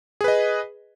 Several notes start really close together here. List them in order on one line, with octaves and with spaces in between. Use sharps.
G#4 B4 D#5